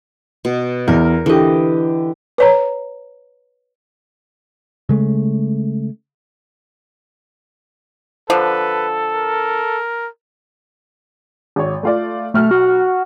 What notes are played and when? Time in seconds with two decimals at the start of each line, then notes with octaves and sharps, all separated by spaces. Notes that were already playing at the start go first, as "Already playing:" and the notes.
0.45 B2
0.88 E2 A#4
1.26 D3 E3 G4 D#5
2.38 B4 C#5 A#5
4.89 C#3 G#3 A3
8.30 D3 F3 A4 B4
9.14 A#4
11.56 G#1 C#5
11.83 A3 F4 D5
12.34 B1 A3 F6
12.51 F#4